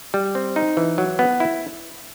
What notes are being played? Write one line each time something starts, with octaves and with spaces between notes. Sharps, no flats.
G3
C4
D#4
E3
F#3
B3
E4